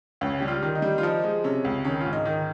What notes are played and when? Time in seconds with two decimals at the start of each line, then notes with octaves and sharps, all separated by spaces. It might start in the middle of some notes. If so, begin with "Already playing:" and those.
0.21 C#2 C#4
0.39 G3 G4
0.48 F4
0.62 D#3
0.75 D#4
0.82 G3
0.98 F4
1.03 F3 D#4
1.24 G#3
1.44 C3 C#4
1.65 C#2
1.85 D#3 C#4
2.01 G#2 F4
2.13 D#4
2.25 D#3